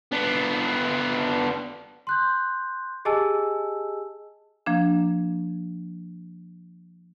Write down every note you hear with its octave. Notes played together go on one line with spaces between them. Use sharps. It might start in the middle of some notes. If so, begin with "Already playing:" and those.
B3 D4
C6 F#6 G6
G4 G#4 D#5 G#5 A5 E6
F3 A#3 D4